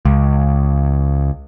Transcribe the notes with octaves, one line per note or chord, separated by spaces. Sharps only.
C#2